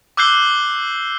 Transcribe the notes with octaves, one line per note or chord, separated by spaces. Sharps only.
D6 E6 F#6 G6 C7 G7